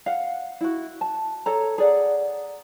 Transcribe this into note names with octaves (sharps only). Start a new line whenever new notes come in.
F5 F#5
E4 F#4
A5
A4 C#5 A#5
G#4 D5 F#5